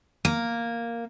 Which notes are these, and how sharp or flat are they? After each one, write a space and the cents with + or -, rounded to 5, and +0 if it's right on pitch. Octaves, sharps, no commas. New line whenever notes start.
A#3 +0